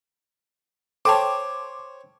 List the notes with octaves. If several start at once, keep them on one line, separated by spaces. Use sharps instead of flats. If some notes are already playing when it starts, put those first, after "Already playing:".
A4 C5 C#5 G5 A5 D6